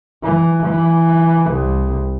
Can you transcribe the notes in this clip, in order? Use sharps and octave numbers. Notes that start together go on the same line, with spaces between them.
E3
E3
C2